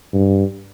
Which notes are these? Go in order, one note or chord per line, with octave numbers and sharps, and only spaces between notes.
G2